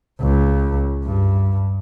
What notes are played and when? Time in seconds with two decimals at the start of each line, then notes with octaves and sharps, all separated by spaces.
0.20 C#2
1.04 G2